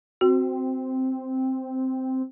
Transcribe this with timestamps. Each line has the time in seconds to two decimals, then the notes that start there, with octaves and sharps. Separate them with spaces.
0.21 C4 F#4